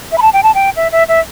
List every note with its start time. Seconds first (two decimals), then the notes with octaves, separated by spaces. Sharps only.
0.12 E5
0.18 B5
0.22 A5
0.33 G5
0.43 A5
0.55 G5
0.76 E5
0.92 E5
1.08 E5